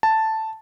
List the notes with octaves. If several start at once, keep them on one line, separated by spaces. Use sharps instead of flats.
A5